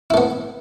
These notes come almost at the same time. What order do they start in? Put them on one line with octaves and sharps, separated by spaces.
E4 A3 B3